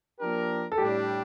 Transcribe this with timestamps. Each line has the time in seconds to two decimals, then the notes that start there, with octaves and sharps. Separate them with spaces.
0.19 F3 A#3 D4 G4 A#4
0.72 A4
0.78 A2 G3 D4 G4